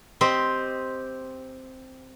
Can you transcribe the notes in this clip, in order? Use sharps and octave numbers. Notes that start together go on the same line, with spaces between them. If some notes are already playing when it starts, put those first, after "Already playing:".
C4 G4 C5 D#5